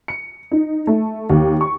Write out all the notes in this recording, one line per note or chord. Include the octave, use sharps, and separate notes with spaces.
C#7
D#4
A3
D#2
C#6